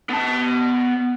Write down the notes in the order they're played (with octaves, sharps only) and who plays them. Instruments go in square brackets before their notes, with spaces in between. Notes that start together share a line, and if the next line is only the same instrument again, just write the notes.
[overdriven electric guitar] B3 A5